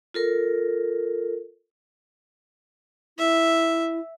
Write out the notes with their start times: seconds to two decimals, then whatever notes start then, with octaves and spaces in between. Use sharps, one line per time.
0.14 F4 A4 A#4
3.18 E4 E5